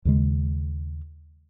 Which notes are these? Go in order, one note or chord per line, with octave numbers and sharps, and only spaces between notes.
D#2 C#3 G#3